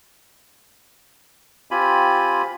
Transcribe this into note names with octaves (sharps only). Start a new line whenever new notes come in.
C4 F4 G4 G#5 B5